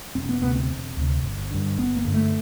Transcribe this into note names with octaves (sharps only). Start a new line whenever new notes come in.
E1 C4
B3
D2 C3 B3
C4
E1
D2 C3
G1
G2 D3
G1 B3
A#3
G2 D3
A3